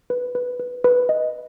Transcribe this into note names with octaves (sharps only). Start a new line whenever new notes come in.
B4
B4
B4
B4
D#5